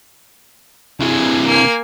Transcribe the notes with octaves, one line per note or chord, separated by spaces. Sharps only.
C3 E3 G#4
A#3 G#5